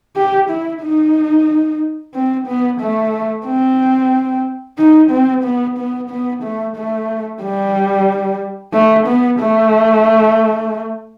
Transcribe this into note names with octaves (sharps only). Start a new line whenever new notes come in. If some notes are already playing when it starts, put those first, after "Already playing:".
G4
E4
D#4
C4
B3
A3
C4
D#4
C4
B3
B3
B3
A3
A3
G3
A3
B3
A3